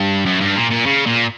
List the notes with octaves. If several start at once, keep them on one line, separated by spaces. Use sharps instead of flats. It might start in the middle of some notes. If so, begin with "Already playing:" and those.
Already playing: G2
F#2
G2
A#2
A#2
C#3
A#2